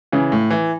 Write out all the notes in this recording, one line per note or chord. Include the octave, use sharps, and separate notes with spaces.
C#3 E3
A2
E3